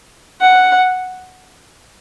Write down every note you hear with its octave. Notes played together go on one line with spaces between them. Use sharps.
F#5